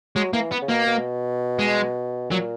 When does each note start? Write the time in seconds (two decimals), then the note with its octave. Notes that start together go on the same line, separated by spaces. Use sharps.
0.16 F#3 G#3
0.33 E3 A#3
0.52 B3
0.62 C#3
0.69 B2 A#3
0.87 B2
1.59 G#3
2.31 A#2 F#3